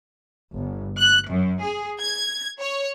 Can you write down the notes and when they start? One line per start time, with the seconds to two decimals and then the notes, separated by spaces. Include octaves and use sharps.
0.56 G1
0.98 F#6
1.30 F#2
1.62 G#4
2.00 G#6
2.59 C#5